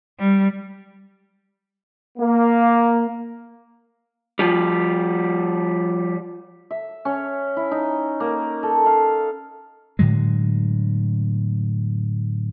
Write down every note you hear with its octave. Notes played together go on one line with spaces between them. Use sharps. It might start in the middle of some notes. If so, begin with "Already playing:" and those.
G3
A#3
F3 G3
E5
C#4
E4
D#4
A#3
A4
F5
A2 D3 F#3 G#3